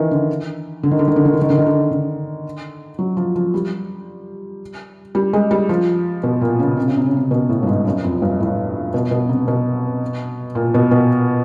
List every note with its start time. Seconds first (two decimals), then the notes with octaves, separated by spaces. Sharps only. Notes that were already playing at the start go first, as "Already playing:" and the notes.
Already playing: D#3 E3
0.11 D3
0.83 D3
0.91 D#3
0.99 D3
1.08 D#3
1.16 D3
1.25 D#3
1.34 D3
1.41 D#3
1.50 D3
1.59 D#3
1.66 D3
1.91 D3
2.99 F#3
3.17 F3
3.36 F3
3.54 G3
5.15 G3
5.33 G#3
5.51 G3
5.69 F3
6.23 B2
6.41 A#2
6.60 C#3
6.77 C3
6.88 C#3
6.97 C3
7.06 C#3
7.17 C3
7.31 B2
7.49 A2
7.63 G2
7.67 G#2
7.85 F#2
8.04 F2
8.22 G2
8.40 A2
8.94 B2
9.11 B2
9.29 C3
9.48 B2
10.55 A#2
10.74 B2
10.91 B2